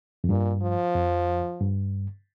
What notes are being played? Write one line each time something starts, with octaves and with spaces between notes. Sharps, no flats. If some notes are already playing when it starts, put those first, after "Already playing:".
F2
G2 A#2
F3
F2
G2